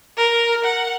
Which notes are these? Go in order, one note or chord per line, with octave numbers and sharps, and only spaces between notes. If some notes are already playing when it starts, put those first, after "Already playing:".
A#4
F#5